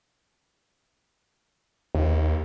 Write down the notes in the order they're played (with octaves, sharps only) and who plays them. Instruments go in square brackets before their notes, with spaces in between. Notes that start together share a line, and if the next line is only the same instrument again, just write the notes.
[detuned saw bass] D#2